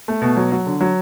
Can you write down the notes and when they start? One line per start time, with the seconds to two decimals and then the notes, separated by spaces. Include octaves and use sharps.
0.08 A3
0.22 B2
0.37 F#3
0.52 F#3
0.66 D3
0.81 F#3